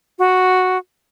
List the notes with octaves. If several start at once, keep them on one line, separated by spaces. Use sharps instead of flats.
F#4